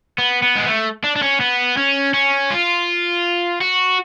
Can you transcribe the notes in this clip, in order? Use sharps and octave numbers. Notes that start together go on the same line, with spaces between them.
B3
B3
G#3
A3
D4
D4
C#4
B3
C#4
C#4
F4
F#4